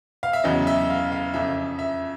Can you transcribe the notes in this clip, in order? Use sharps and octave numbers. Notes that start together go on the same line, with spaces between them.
F5
E5
E2 C#3 F#3 D#5
E5
F5
F5
F2 C#3 F3 E5
E5